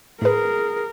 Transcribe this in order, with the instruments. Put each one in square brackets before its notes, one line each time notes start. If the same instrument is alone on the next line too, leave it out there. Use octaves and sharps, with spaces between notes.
[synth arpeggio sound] A2 B4 [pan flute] G#4 [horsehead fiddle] A#4